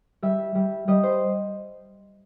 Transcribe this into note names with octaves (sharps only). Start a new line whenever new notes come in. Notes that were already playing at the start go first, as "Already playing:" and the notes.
G3 E5
G3
G3 D#5
C5